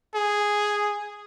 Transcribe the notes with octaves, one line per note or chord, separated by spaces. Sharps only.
G#4